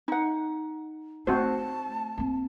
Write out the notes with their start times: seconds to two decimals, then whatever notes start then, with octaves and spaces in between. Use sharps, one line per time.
0.08 D#4 F#5
1.27 A3 C4 F#4 C5 A5
2.18 A#3 C4